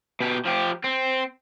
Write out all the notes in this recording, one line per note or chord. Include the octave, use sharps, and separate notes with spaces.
B2 G4
F3 G4
C4